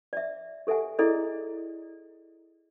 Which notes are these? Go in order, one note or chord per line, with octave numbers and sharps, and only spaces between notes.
D5 E5
G4 A4 E5 F#5 G#5
E4 G#4 A4 D5 D#5